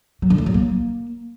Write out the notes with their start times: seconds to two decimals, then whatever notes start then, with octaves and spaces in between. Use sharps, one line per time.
0.22 F#3
0.30 D3
0.38 A3
0.46 F#3
0.54 A#3